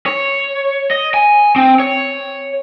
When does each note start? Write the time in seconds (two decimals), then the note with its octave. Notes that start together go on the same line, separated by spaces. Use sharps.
0.06 C#5
0.91 D#5
1.14 G#5
1.56 C4
1.80 C#5